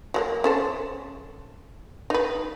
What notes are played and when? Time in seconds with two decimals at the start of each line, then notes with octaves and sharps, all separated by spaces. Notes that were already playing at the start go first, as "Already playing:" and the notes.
0.14 F#3 G#3 A#3
0.44 C#4 A4 C5
2.10 D#4 B4